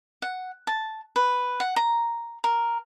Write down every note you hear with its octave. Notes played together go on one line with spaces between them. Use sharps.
F#5
A5
B4
F#5
A#5
A#4